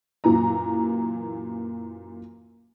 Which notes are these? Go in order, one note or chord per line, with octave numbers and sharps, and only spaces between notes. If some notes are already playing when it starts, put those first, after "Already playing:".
F#2 A#2 E3 A#5